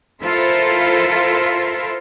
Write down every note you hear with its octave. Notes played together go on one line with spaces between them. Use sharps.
E4 F4 A4 A#4 C5 E5